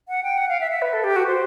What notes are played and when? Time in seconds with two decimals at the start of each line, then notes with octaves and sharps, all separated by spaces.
0.09 F#5
0.23 G5
0.38 F#5
0.49 F5
0.60 E5
0.71 E5
0.82 B4
0.93 A4
1.04 G4
1.16 F#4
1.27 C5